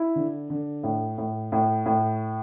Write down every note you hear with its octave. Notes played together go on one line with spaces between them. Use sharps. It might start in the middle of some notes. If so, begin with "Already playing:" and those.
Already playing: E4
D3
D3
A2
A2
A2
A2